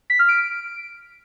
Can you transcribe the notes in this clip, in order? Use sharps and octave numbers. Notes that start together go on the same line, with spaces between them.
B6
F6
D7